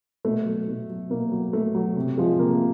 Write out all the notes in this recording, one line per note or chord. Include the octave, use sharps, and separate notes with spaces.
B2 A3
F#3
B2
F#3
B2 A#3
F#3
B2 A3
F#3
C3
F3 G#3
C3 A#3